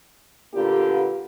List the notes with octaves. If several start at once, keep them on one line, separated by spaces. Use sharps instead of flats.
A#2 D3 A#3 B3 F4 G4